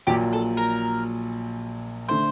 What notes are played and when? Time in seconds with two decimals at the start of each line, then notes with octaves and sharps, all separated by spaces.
0.07 A#1 A#2 F#3 G4
0.33 A4
0.57 A#4
2.08 D3 A3 C5